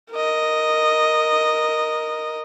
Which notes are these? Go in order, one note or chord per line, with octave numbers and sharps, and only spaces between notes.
A#4 D#5